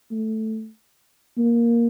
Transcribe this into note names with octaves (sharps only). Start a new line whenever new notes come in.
A3
A#3